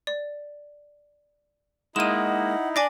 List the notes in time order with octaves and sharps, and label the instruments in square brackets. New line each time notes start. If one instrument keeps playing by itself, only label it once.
[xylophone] D5
[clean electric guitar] G#3 A#3 [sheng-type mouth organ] D#4 E4 [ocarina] F#5 [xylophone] D#7 E7
[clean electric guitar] D4 [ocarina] D5 [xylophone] G#5 D6 A#6